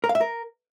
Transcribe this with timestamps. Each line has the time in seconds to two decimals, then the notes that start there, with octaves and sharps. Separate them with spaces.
0.04 A#4
0.09 F5
0.15 E5
0.21 A#4